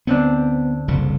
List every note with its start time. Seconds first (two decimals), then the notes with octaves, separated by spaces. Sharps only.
0.07 D2 B3 C4 D4
0.88 F#1 C2 D3